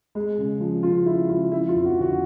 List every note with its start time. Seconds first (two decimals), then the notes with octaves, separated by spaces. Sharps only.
0.15 G#3
0.38 C#3
0.60 F3
0.83 C#3 F4
1.06 G#3 E4
1.29 C#3 F4
1.51 F3 E4
1.68 F4
1.73 F2
1.85 F#4
1.96 D3
2.01 F#4